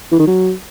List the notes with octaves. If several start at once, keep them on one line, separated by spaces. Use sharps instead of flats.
E3
D#3
F#3